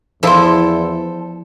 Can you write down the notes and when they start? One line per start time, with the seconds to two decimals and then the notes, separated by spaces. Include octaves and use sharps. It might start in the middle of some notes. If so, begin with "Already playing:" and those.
0.23 E2 F3 E4 A4 C5